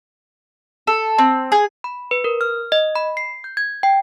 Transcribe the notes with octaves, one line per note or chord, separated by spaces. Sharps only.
A4
C4
G#4
B5
B4
A#4
F6
D#5
B5
C7
G6
G#6
G5